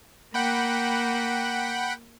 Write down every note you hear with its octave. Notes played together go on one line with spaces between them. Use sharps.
A#3 F#5 G5 B5